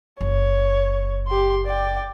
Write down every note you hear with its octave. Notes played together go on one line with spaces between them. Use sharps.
F#1 C#5
G4 C6
D5 G5